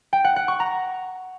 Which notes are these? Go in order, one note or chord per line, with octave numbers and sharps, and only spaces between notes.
G5
F#5
F#5
C#6
A#5